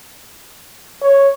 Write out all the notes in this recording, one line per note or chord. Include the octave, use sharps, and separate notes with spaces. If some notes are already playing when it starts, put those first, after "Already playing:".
C#5